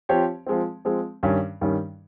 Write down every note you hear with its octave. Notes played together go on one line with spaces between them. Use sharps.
F3 C4 G4 C#5
F3 G#3 C4
F3 G#3 C4
G2 D#3 G3 C#4
G2 D#3 G3 C#4